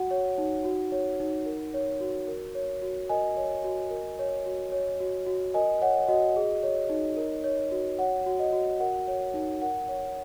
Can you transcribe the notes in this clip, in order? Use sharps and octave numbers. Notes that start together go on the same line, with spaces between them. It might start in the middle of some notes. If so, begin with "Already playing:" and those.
Already playing: F#4 F#5
C#5
D#4
F#4
C#5
D#4
A#4
C#5
F#4
A#4
C#5
F#4
A#4 D#5 G#5
C#5
F#4
A#4
C#5
F#4
C#5
F#4
F#4
A#4 D#5 G#5
C#5 F#5
F#4 D#5
G#4
C#5
D#4
A#4
C#5
F#4
C#5 F#5
F#4
D#5
F#4
A#4 F#5
C#5
D#4
A#4 F#5
C#5